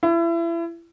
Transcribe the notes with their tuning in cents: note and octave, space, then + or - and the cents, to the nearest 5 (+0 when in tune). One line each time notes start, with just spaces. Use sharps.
E4 +30